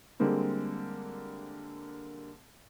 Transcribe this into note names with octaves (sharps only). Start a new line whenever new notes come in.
D3 G3 G#3 A#3 C4